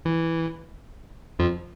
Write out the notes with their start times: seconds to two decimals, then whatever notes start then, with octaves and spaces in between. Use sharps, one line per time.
0.05 E3
1.39 F2 F3